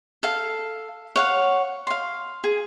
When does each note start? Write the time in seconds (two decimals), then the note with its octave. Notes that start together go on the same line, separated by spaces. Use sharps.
0.23 A4 F5
1.16 C#5 F5 F#5
1.87 F5 C6
2.44 G#4